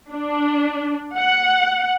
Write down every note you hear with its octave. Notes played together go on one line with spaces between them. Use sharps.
D4
F#5